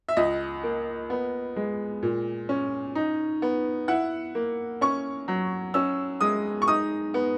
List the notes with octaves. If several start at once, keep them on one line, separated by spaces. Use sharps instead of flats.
E5
C#2 D#5
A#3
B3
G#3
A#2
C#4
D#4
B3
E4 F#5
A#3
C#4 C#6
F#3
C#4 E6
G#3 D#6
C#6
D#4 D#6
B3